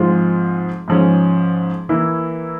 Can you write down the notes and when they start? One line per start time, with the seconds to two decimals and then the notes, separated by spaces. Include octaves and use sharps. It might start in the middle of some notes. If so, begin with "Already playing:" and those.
Already playing: G#2 F3 G#3 C4 F4
0.88 G#2 F3 G#3 C#4
1.89 E3 A#3 E4